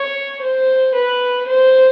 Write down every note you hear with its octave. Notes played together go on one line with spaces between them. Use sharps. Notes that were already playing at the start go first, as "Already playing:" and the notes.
Already playing: C#5
C5
B4
C5